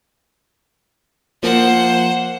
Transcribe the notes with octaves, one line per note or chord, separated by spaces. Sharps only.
F3 A#3 C5 F#5